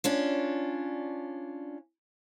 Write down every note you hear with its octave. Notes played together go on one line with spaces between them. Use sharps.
C#4 D4 F4